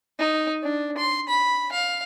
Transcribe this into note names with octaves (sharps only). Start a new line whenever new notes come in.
D#4
D4
C6
B5
F5